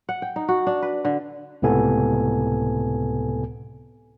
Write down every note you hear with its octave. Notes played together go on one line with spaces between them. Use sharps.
F#5
G5
D#4
F#4
D4
B4
D3
C#2 A2 C3 B3 A4 G#5